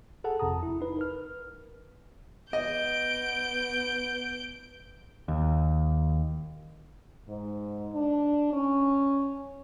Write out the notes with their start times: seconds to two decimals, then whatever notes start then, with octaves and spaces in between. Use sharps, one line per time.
0.24 G#4 A4 F#5 A5
0.40 G1 F2 C3 A5 A#5 D#6
0.63 E4
0.81 D#4 B4
0.97 A#4 B4 F6
2.53 B3 D#5 G6 D7
5.28 D#2
7.28 G#2
7.94 D4
8.53 C#4